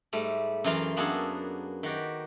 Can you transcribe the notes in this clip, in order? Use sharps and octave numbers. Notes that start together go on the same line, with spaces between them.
G#2 G3 A3
F#2 E3 F4 F5 A#5
A#3 B3 D4 F#4 G#4 A4
D#3 F#4 G4